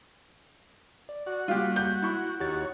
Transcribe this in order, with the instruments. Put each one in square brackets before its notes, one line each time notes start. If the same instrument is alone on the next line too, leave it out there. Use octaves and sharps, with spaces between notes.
[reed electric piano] D5
[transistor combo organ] F#4 [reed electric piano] D5
[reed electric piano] G3 G#3 A#3 [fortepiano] F4 G4
[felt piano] G6
[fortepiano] E4 C#6
[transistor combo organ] D#2 F#4 C#5 [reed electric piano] G4 A6